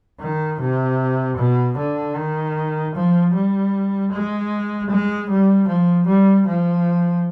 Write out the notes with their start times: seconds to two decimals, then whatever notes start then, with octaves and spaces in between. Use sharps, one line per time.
0.20 D#3
0.60 C3
1.38 B2
1.78 D3
2.17 D#3
2.95 F3
3.34 G3
4.12 G#3
4.90 G#3
5.30 G3
5.68 F3
6.07 G3
6.47 F3